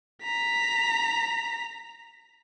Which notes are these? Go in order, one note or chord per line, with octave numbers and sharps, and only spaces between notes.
A#5 B6